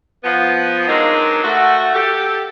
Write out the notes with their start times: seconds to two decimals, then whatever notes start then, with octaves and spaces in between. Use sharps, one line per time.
0.24 F3 B3
0.88 F#3 G#3 C4 D4 D#4 A#4
1.43 A3 F#4
1.94 G4 A4